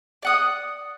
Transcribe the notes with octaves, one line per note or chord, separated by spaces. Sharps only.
D5 F#5 D#6